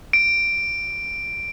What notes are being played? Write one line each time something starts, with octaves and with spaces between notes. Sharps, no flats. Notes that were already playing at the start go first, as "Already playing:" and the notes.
D7